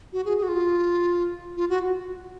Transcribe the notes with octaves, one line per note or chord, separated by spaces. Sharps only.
F#4
G#4
G#4
F#4
F4
F4
F#4